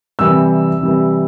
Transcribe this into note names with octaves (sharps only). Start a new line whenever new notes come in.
C3 E3 G3 E6
C3 E3 G3